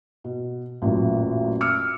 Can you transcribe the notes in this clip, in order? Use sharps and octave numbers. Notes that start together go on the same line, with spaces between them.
B2
A1 F#2 A#2
D6 E6 F6 C#7